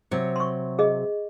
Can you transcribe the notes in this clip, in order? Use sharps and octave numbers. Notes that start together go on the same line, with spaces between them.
C3 F#3 C#5
C6 C#6
G#4 D#5